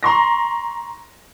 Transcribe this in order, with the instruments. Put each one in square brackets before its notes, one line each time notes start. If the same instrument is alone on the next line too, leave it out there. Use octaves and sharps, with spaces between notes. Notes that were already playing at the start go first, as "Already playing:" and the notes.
[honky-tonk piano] A#5 C6 C#6 A#6